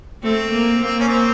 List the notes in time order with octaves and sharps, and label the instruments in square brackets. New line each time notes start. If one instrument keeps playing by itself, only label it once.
[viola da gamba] A3 [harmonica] C4
[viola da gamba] A#3
A#3
[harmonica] C#4
C4